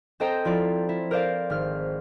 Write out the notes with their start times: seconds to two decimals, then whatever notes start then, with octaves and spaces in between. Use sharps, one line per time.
0.20 C4 A4 C5 D#5 G5 A#5
0.45 F3 E4 F4 D5
0.89 E4
1.11 A#4 C5 D5 F5
1.50 G#1 F6